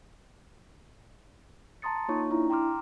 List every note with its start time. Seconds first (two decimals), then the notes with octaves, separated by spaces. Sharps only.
1.82 A5 A#5 C6 D#6 A6 C#7
2.08 A#3 D#4 F4 C#5 C#6
2.30 D4 E4 A#5
2.50 G5 A#5 C6 D6 F6